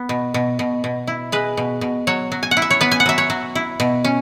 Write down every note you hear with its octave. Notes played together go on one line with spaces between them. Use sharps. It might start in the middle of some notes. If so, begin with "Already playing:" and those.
Already playing: B3
B2
B2
B2
B2
E4
G#3 B4
B2
B2
F#3 C#5
F#3
G#5
F#5
E4
E5
C#5
B3 B4
G#5
F#5
F#3 E5
C#5
F#3
E4
B2
C#4